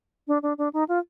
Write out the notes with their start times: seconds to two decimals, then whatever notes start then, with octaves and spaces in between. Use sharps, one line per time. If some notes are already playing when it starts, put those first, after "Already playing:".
0.28 D4
0.43 D4
0.58 D4
0.73 D#4
0.88 F4